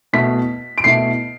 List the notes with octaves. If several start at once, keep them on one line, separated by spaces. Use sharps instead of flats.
B2 A3 E4 B6
D7
B2 A3 E4 C7